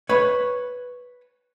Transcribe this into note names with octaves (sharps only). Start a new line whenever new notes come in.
B4 C#5